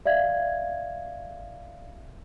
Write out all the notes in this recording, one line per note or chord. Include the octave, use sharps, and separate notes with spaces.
D5 E5 F5 G#6